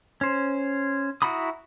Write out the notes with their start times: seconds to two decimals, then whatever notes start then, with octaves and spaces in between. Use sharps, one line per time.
0.21 C#4 C5
1.22 E4 F#4 A#5 B5 D#6